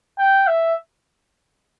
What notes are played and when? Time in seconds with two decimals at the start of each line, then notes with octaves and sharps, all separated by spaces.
0.19 G5
0.48 E5